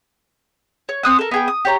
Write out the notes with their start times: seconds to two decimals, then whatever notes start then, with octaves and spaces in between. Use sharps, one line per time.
0.89 C#5
1.03 C4 D#6 F#6
1.19 A4 A#4
1.31 B3 G#4 G5
1.48 D#6
1.65 G4 C#5 A#5